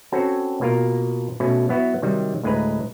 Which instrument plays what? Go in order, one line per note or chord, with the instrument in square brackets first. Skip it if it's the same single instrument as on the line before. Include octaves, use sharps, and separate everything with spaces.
[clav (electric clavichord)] C4 C#4 F#4 A4 B4 C#5
B2 A#3 F4 A#4 F5
B2 A3 C#4
F#3 B3 E4 F#4
C3 D#3 F#3 G3
D2 A2 G#3 G#4 B4 A#5